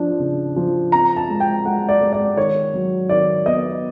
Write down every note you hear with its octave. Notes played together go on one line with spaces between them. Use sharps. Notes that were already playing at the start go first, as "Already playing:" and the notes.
Already playing: F3 D4
C#3
F3
C4 A#5
A5
G#3
G5
G#3 F#5
D5
G#3
D5
D#3 C#5
F#3
D#3 D5
B3 D#5